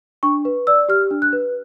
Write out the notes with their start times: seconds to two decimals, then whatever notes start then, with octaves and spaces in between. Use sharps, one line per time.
0.23 D4 C#6
0.45 B4
0.67 D5 E6
0.89 G4 F6
1.11 D4
1.22 F#6
1.33 B4